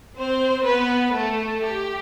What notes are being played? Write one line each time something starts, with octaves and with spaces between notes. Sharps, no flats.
C4 C5
B3 B4
A3 A4
G4